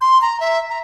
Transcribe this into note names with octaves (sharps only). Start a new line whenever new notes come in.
C6
A#5
E5
A#5